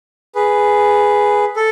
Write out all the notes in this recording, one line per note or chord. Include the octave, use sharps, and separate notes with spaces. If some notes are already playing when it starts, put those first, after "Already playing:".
G#4 B4
A4